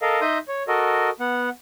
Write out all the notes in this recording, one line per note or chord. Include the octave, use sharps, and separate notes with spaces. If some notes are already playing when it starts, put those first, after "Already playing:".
A4 A#4 D#5 F5
D#4 D#5 E5 C6 D#6 G6
C#5
F#4 A4 A#4 D#5
B3 F#5